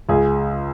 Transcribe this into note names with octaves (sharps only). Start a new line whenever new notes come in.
C#2 G#4